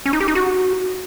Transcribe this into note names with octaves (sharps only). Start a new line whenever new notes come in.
C#4
D#4
G4
D#4
F#4